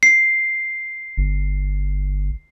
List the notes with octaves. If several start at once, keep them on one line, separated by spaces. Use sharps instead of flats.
C7
G1